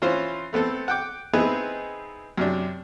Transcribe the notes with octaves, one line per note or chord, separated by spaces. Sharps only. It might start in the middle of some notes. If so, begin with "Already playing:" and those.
E3 C#4 F4 C5
A3 B3 C4 A4
F#5 G5 D6
B3 C4 D#4 E4 G#4 B4
F#2 C3 D4